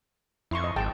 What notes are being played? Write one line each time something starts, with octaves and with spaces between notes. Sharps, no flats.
F2 E4 C6 C#6
D#5
G#1 G#4 G5 A5